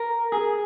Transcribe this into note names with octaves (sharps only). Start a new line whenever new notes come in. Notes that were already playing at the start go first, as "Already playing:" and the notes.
Already playing: A#4
G#4